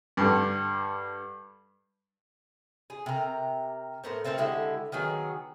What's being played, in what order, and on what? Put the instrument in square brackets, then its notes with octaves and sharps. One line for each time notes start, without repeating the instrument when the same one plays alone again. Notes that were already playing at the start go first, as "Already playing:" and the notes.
[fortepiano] G2 D3
[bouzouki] G#4
C3 A#4
A2 B3 A#4 C5
A3 C4 G4 A#4
D3 G#3 E4 G4
D#3 F#3 B3 G#4